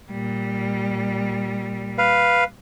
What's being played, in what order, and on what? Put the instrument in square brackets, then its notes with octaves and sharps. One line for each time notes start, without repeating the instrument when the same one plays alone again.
[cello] A#2 G3
[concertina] B4 F5